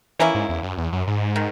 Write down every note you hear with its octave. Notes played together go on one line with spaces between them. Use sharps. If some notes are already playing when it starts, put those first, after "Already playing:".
E3 A#3 C#4 E4
G#2
E2
F#2
E2
F#2
G#2
D#3